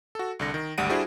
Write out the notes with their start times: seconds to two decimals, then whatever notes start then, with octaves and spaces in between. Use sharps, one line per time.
0.15 F#4 A4
0.39 C2 D3 A#6
0.54 D#3
0.78 G#1 D2 G3 F#5 D7 D#7
0.89 G3 D4 E4 F#4 G#4 C5